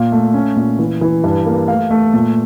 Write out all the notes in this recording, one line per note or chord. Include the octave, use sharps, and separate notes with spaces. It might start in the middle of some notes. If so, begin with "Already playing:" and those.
Already playing: A#2 F5
A3
C#4
A#2
E3
E3
G2
A#3
A3 F5
A3
A#2